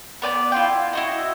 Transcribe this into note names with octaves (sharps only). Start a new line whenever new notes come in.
B3 D5 G#5 D6
E4 F4 G5
E4 F#4 D#5